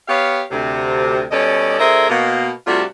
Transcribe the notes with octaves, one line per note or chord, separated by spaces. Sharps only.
B3 G4 C#5 F5
D2 C3
B2 G3 C#4 A4 D5 D#5
D2 G#4 A#4 C5 E5
B2 A#3
C3 G3 A3 D4 F4 F#4